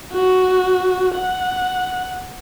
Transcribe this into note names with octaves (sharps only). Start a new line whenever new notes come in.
F#4
F#5